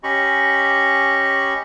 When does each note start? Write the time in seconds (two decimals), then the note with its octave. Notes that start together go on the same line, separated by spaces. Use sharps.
0.03 C#4 G4 D#5 B5 C#6